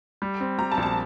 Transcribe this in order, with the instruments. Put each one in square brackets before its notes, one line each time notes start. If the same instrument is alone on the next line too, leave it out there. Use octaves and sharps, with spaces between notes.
[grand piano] G3
C4
[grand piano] G3 [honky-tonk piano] A#5
[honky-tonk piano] A5
[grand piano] A#1
[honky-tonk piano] A5